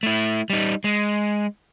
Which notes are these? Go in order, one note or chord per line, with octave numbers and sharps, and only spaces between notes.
A3 E4
G3 D#4
G#3